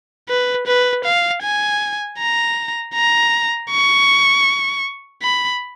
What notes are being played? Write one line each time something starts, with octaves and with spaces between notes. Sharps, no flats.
B4
B4
F5
G#5
A#5
A#5
C#6
B5